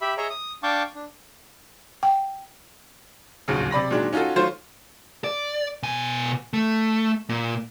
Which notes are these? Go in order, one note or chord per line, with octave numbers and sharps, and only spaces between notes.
G4 E5 B5
G#4 C#5 D#5 E5 A#5
D#6
D4 F5 G5 A5 C#6 D6
D4
G5
D1 A#1 D#2 C#3
C3 D5 B5 A#6
A#2 D#3 F#3 G#3 D4
C#4 D#4 F4 F#4 A4
D#3 F#3 A3 F4 C5 C#5
D5
B2 G#5
A3
A#2